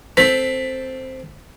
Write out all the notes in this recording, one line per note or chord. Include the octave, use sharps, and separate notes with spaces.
C4 A4 B6